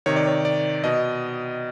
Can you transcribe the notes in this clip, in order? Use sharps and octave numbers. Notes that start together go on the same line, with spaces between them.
C3 D#3 C#5
D5
C#5
D5
B2 D#5